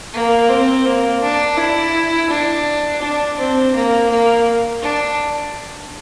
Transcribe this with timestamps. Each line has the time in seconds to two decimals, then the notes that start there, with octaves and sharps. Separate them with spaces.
0.14 A#3
0.49 C4
0.85 A#3
1.22 D4
1.58 E4
2.30 D4
3.02 D4
3.38 C4
3.74 A#3
4.10 A#3
4.82 D4